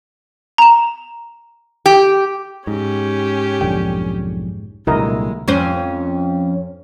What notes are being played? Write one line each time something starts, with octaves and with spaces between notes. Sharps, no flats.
A#5 E7
G4
G#2 C#4 G4
B1 F2 D3 G5
C2 A#2 D3 F#3 G#3 E4 A#4 D#5
F2 C#4 C5